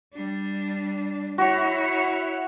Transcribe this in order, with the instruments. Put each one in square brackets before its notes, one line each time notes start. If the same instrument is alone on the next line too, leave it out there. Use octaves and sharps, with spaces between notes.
[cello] G3 D4
[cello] E4 C#5 [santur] F#4